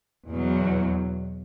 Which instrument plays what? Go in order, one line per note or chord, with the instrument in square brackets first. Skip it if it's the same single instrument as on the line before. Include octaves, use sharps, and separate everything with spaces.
[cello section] E2 B2 F#3